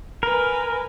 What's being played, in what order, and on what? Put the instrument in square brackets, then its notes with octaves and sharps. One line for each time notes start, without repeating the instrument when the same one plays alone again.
[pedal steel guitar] A#4 [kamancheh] B4 G#5